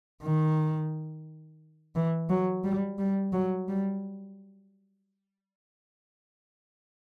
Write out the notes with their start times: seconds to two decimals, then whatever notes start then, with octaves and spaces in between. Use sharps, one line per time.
0.23 D#3
1.95 E3
2.29 F#3
2.64 G3
2.98 G3
3.33 F#3
3.68 G3